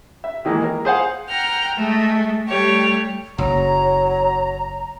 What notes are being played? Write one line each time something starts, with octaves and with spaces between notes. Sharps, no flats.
E5
D#3 E3 G#3 A#3
A#4
G#4 C5 F5 F#5
F#5 G5 A#5 F6
G#3 A3
G3 A3 G4 C#5
F#1 F#3 C#5 A#5